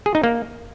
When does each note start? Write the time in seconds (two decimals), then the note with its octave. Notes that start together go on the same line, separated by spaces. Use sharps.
0.06 G#4
0.15 D#4
0.23 A#3